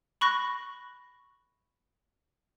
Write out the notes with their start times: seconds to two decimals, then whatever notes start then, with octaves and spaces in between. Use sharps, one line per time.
0.21 B5 C#6 F#6 A#6